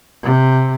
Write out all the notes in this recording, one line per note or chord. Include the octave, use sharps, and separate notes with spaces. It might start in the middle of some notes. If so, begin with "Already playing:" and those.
C3